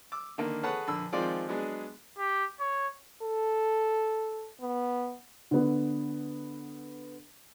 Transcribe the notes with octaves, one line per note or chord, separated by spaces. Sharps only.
D6 E6
D3 D#3 A#3
G#4 A4 B4 C#5 F#5 A5
A#1 D3 B5 E6
D#3 F3 G#3 C4 F4 D5
F#3 G#3 B3 D4 G#4
G4
C#5
A4
B3
D3 B3